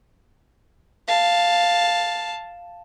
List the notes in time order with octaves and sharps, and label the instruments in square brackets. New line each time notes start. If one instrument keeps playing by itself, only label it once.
[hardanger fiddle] F5 A5